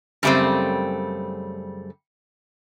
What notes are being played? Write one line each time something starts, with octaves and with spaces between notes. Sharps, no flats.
F#2 C#3 G3 A3 C4